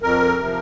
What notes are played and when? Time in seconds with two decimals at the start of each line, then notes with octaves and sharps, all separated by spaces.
0.02 F2 A#4
0.39 C3 F3